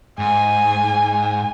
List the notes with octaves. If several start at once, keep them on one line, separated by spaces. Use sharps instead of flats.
G#2 G#5